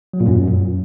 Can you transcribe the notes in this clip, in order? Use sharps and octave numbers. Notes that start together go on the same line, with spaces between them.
F#3
A#2
F#2